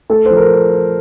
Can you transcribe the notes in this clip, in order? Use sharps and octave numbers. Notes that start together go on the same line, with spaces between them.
A3 A4
F3 C5
A#4